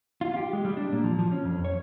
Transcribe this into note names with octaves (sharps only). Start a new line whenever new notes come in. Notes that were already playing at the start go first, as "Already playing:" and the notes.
F4
G4
G#3
G3
D4
A#2
F3
F3
C#4
F2
C#5